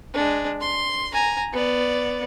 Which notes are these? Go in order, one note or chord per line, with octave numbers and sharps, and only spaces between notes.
G#3 D4
C6
G#5 A#5
B3 D5